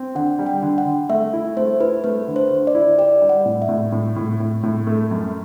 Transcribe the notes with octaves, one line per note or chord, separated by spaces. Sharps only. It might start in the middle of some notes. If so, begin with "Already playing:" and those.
Already playing: C4
D3 F#5
G3
G5
D3
F#5
D3
A3 E5
E4
A3 C5
E4 B4
A3 B4
D3
C5
D3
D5
E4
G4 D5
G3
F#5
A2
E5
A2
A2
A2
A2
A2
A3
F#2